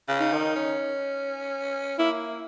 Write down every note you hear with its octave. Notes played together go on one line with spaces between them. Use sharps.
C#3
D#4
D#3
C#4
A#3 E4